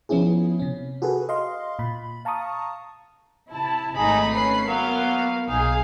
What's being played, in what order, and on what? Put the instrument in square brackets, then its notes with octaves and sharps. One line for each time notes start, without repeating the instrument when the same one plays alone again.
[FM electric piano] F3 B3 C#4 E4 G#4
C3 C#4
F#4 G#4 A4 B4
D#5 F5 C6
A#2 B5
F5 A5 A#5 C#6 D#6
[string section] C3 E4 A5
[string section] G#1 D#4 A#5 [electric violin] A3 B5 [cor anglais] G#4
[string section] C#4 C7 [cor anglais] B4
[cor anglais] F#3 [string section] A#3 [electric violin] B3 F5
[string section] B1 G#4 [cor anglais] D#4 [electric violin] F5